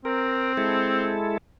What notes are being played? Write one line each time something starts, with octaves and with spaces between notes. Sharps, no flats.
C4 A#4
G#3 E4 A4